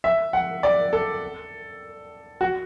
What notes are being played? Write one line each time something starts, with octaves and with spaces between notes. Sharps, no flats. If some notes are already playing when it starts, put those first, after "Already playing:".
E5
F#5
D5
A4
F#4